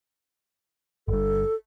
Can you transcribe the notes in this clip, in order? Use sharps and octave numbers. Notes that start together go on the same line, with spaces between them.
G1 G2 A4